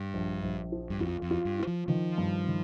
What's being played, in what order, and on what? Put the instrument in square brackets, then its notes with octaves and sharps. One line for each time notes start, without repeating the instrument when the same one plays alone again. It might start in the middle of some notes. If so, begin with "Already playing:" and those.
Already playing: [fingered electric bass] G2
[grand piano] A#1
A#1
F3
[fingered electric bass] G2
[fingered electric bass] F2 [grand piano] F4
[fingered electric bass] F2
[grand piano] F4
[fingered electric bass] G2
[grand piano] F4
[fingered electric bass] F3
[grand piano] D#3 [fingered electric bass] F3
[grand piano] G2
D#3